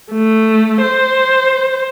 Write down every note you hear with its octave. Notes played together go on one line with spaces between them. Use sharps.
A3
C5